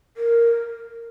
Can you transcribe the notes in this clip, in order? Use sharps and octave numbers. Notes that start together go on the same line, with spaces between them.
A#4